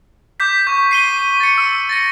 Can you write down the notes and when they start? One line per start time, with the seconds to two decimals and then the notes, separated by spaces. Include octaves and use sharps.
0.40 D6 G6 B6
0.67 C#6 G6
0.91 C7 D#7 G7
1.40 A6 C#7
1.58 E6
1.89 A6 A#6 C#7